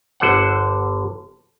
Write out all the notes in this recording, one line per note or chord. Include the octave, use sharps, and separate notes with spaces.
G1 D3 C5 F#5